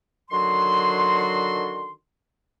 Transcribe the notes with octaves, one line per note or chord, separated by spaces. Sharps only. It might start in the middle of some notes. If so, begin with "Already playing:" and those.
D3 D#3 F#3 F#4 C6